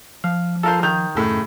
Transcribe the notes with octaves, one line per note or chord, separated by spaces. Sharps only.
F3 F5
F4 A4 A#4 C5 F5
D#3 G6 F7
F#2 A2 C#3